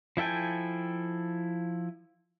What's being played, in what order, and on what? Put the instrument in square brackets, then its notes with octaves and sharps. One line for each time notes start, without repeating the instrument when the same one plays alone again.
[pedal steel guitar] F3 E4 A4 G5 G#5